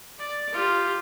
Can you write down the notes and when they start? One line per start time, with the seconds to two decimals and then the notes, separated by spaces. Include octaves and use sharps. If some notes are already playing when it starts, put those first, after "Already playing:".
0.19 D5
0.54 F4 G4